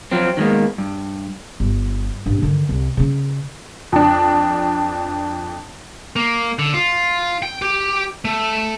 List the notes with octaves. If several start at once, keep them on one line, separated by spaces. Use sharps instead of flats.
F3 F#3 C4
D#3 F#3 G#3 A#3 B3
G2
G1
A1 G2
D3 D#3
C2
C#3 C#4
F2 D4
A#3
D3
F4
G5
G4
A3